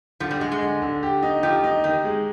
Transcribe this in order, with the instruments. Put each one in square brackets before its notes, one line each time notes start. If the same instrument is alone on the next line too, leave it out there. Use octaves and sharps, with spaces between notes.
[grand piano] D3 [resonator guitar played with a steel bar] F3
[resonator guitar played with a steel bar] G3
[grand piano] D3 [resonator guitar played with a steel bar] G#3
[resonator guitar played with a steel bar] G#3
[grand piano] D3
D3
G4
D#4
[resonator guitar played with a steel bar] F3 [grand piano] G4
[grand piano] D#4
[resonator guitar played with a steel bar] D#3 [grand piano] G4
[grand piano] G#3